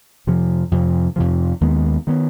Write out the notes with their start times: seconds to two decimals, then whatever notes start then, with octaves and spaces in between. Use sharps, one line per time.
0.27 F2 C3 F3
0.71 F2 C3 F3
1.16 F2 C3 F3
1.61 D#2 D#3 G#3 B3
2.07 D#3 G#3 B3